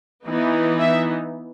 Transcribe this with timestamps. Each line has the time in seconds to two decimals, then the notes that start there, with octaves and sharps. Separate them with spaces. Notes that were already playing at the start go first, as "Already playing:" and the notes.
0.25 E3 B3 D#4
0.79 E5